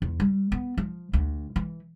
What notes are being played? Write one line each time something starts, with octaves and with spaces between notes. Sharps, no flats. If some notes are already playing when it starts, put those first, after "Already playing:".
E2
G3
B3
F3
D2
E3